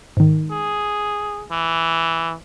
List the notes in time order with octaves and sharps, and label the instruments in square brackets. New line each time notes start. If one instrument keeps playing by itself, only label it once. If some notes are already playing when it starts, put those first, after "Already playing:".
[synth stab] G#2 D#3
[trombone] G#4
E3